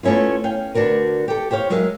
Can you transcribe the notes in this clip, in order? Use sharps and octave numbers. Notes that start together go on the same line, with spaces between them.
A3 B3 C#4 E4 F4
C#4 F5 G5
D2 D4 F#4 A#4 B4
G4 A4
G4 C5 C#5 F5
F#3 G#3 A#4 E5 F5